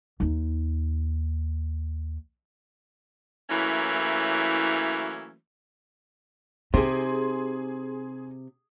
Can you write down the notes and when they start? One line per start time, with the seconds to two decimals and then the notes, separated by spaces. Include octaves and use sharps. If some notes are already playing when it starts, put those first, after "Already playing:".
0.20 D#2 D#4
3.50 E3 F#3 A3 A#3 C#4 E4
6.74 C3 D#4 G#4 C6